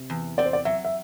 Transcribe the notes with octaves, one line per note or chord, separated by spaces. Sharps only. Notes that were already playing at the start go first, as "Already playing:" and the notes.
Already playing: C3
E2
C4 D5
C5
D5
F#3 E5
E5